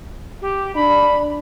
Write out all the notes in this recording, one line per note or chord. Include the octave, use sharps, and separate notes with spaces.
G4
D4 B5